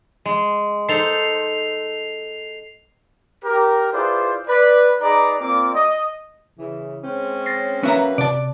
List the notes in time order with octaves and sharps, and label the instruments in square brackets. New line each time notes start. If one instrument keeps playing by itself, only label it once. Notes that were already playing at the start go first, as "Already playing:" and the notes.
[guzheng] G#3
[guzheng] D#4 A4 C5 [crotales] C7 F7
[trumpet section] G4 A#4
E4 F4 G#4 B4 C5 D5
B4 D5
D#4 G#4 B4 D5 A#5
A#3 C4 F4 D5 D6
D#5
[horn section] C#3 E3
G#3 C4 C#4
[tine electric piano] A6 A#6 C7
[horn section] F#3 A#3 B4 [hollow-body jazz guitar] C#4 E5 A#5
[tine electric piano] C3 [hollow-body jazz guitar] D5 A5